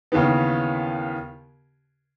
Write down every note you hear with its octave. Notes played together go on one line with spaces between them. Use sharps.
D#2 C#3 E3 B3